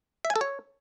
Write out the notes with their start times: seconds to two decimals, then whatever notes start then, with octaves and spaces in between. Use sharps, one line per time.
0.25 E5
0.30 G#5
0.36 A4
0.41 C#5